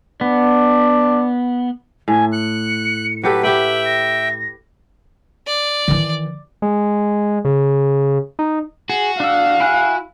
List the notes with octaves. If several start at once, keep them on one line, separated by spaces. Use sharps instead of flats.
B3 D4
A2 G#5
F#6 C#7
F#3 G4 A4 B4
G4 B4 E5 G5 F#7
A#6
D5
D#3 E3
G#3
C#3
D#4
F#4 G#4
D4 F5 E6
E4 G#5 F#6